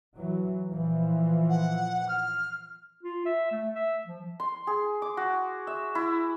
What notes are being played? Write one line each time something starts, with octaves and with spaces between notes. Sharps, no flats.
E3 F#3
A#2 E3 F3
F#5
F6
F4
E5
A3
E5
F3
C6
G#4
D6
F#4
E5
E4